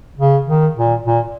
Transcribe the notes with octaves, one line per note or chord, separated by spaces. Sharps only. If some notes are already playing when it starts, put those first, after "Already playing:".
C#3
D#3
A#2
A#2